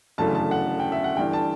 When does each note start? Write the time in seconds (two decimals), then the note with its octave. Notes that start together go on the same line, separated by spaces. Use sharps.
0.18 G1 F#2 C#3 E3 A3 A5
0.35 A5
0.51 F#5
0.80 G5
0.92 E5
1.04 F#5
1.16 G1 G2 E3 G5
1.33 A5